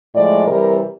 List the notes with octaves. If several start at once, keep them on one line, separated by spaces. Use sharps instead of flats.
A2 F3 G#3 D5
C3 E3 G3 A#4